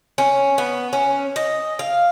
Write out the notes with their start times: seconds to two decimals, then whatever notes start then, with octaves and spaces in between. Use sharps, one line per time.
0.18 C#4
0.58 B3
0.93 C#4
1.36 D#5
1.79 F5